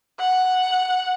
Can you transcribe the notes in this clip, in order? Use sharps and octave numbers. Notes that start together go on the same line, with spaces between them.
F#5